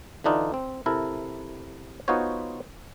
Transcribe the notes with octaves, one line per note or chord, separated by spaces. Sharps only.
D3 E3 D4 D#4 F4
C4
C3 E4 A4 A#4
B3 D#4 F4 F#4 C5 C#5